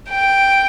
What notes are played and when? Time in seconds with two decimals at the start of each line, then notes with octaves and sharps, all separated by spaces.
0.11 G5